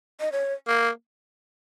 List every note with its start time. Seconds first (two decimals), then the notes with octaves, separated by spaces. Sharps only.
0.21 D#5
0.32 C#5
0.68 A#3